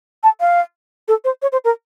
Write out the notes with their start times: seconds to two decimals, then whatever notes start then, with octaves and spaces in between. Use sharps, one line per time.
0.23 A5
0.40 F5
1.08 A4
1.24 C5
1.42 C#5
1.52 C5
1.64 A#4